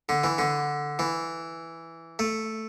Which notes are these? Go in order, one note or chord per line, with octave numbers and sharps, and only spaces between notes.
D3
E3
D3
E3
A3